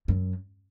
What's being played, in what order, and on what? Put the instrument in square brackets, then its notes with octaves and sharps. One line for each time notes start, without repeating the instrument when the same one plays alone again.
[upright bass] F#2